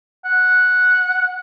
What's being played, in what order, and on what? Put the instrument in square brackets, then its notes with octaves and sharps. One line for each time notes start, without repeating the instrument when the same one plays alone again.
[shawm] F#5